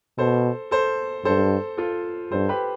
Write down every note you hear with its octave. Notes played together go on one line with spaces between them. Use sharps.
B2 A4 C5
A4 C5
G2 A4 C5
F4 A4
G2 A4 C5
G4 B4